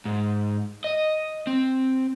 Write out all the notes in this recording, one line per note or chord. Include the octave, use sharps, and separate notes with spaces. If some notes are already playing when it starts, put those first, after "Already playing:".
G#2
D#5
C4